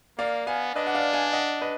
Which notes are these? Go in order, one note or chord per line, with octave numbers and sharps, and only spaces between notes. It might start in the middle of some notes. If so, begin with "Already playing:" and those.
A#3 D5 F5
B3 F5 G#5
D4 B4 D#5
F#5
D5 F5
F5 G#5
D#5 F#5
B4 D#5